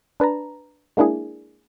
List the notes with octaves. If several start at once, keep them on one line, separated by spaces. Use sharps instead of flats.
D4 B4 A5 A#5
G#3 A#3 D4 E4 G#4